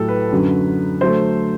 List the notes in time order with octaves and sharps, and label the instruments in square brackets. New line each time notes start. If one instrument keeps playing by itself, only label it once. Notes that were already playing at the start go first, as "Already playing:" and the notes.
Already playing: [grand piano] A2 F#3 A3 G4 A4
B4
F#2 D3 F#3
D3 F#3 A3 C5